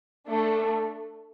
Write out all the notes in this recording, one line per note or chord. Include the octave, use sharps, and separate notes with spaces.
A3 D4 A4